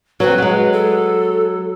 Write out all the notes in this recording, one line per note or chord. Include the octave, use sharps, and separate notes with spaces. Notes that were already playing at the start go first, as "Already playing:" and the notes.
F#3 C4 B4
F#3 G#3
A4